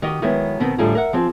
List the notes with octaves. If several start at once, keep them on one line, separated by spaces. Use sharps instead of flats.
D#3 F#4 G4 D#5
D#3 F#3 G#3 B3 E4
B2 D#3 B3 C4
A2 D3 G3 D#4 F4 G#4
A#4 E5 F#5
F3 C4 G#4